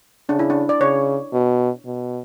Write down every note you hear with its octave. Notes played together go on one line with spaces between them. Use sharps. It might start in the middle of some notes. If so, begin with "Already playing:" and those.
C#3 D4
E4
D4
D5
C#3 C#5
B2
B2